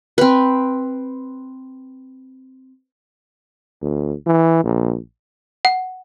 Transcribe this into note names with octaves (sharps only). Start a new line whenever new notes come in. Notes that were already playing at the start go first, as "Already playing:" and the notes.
C4 B4
D2
E3
A#1
F#5